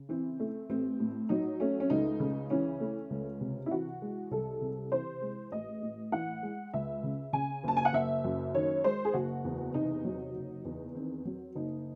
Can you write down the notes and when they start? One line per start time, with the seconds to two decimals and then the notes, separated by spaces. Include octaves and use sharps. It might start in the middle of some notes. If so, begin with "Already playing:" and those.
Already playing: C#3
0.09 E3 C4
0.40 A3
0.69 A1 C4
1.00 A2
1.29 F#3 D#4
1.60 A3 C#4
1.80 C#4
1.90 C#2 D#4
2.20 C#3
2.50 E3 C#4
2.80 A3
3.10 C#2
3.41 C3
3.66 E4
3.71 E3 F#4
4.02 G#3
4.31 C2 A4
4.61 C3
4.92 E3 C5
5.22 G#3
5.52 A1 D#5
5.82 A2
6.12 E3 F#5
6.43 G#3
6.74 C#2 E5
7.03 C#3
7.33 C#3 G#5
7.64 F#1 A5
7.77 G#5
7.85 F#5
7.93 F#1 E5
8.24 F#2
8.54 D#3 C#5
8.84 G#3 C5
9.05 G#4
9.14 F#1 F#4
9.45 E2
9.74 C3 D#4
10.05 F#3
10.35 F#1
10.65 E2
10.95 D#3 C4
11.25 F#3
11.55 F#1 D#4